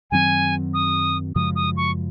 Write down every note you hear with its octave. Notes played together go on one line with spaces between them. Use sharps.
F#2 D#3 F#3 C4 G#5
D#6
F#2 C#3 F3 G#3 D#6
D#6
C#6